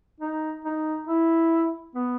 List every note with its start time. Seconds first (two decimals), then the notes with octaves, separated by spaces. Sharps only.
0.20 D#4
0.65 D#4
1.08 E4
1.95 B3